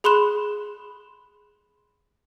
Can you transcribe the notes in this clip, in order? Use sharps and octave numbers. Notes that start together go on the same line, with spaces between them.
G#4 B5 C6 F#6 E7